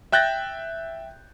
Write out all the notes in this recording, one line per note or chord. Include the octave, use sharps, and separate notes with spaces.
E5 G5 F#6 G6 A6 A#6